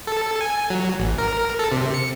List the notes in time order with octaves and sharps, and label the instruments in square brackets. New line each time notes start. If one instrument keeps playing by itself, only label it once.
[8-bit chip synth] A4
G#5
F#3
A1
A#4
A#4
A4
C3
C#7